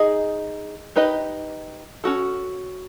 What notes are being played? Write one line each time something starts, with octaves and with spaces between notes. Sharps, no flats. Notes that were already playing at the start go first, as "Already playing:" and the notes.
Already playing: D#4 G#4 D#5
D#4 G4 B4 D#5
C#4 F#4 A4